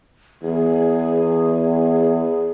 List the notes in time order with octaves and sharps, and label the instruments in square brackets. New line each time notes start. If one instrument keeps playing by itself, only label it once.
[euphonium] E2 [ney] G#4